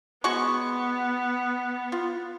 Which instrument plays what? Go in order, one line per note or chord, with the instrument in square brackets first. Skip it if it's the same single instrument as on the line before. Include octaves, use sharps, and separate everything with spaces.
[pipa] G#3 F#4 C#6 [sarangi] B3
[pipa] F4